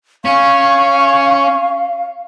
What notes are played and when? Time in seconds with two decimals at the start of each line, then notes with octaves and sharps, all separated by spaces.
0.25 C#4 F5 C#6